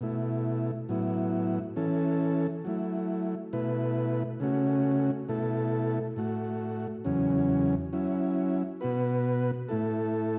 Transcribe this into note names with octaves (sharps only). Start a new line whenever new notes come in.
B2 A3 E4
A2 F#3 B3 E4
E3 C#4 A4
F#3 A3 E4
B2 A3 E4 B4
C#3 A3 C#4 F#4
B2 A3 E4 A4
A2 A3 F#4
E2 C#3 F#3 C#4
F#3 C#4 E4
B2 B3 F#4 B4
A2 A3 E4 A4